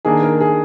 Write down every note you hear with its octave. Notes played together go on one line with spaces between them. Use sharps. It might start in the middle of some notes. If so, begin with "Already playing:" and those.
D#3 A#3 D4 G#4
A#4
G#4